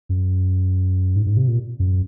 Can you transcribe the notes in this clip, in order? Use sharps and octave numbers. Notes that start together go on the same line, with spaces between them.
F#2
G#2
G#2
C3
A#2
F#2